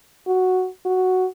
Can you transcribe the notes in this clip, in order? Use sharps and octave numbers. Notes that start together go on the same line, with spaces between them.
F#4
F#4